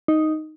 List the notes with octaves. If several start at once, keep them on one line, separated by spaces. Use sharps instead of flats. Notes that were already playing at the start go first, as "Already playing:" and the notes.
D#4